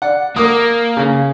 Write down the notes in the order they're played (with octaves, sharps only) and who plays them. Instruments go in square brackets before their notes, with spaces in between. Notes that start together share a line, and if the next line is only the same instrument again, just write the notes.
[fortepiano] D5 F#5
[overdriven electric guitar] A#3 [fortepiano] A#4 D6 D#6
[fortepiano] C#3